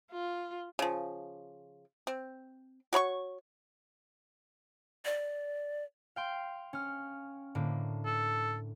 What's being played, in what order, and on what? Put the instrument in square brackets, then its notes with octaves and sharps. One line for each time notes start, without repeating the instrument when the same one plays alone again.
[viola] F4
[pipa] C#3 F3
C4
F#4 C#5 B5 C#6
[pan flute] D5
[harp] F5 G5 C6
C#4 F6
A2 D3 A#3
[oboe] A4